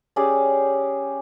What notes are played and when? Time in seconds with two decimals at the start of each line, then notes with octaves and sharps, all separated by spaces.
0.16 C#4 G4 G#4 D5